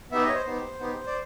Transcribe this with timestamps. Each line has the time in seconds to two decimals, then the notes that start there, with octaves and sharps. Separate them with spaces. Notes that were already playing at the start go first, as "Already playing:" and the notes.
0.12 B3 D#4 G4 E5
0.23 D#5
0.29 C#5
0.34 C5
0.46 B3 D#4 G4
0.80 B3 D#4 G4
1.07 D5